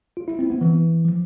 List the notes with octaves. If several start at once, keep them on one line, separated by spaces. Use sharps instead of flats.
F4
E4
C4
B3
E3
F3